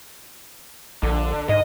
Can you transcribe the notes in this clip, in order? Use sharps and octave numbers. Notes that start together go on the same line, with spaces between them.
A#1 D3
G#2 D#5